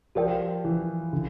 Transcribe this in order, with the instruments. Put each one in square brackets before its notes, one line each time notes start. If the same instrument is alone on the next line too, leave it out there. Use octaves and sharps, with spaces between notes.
[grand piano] F3 [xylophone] G4 A#4 D5 G5
[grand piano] E3
D3